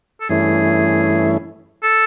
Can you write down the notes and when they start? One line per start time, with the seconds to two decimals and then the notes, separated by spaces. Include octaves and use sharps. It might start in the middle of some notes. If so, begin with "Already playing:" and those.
0.21 A4
0.29 G2 E3 A3 C#4 E4 G#4
1.84 A4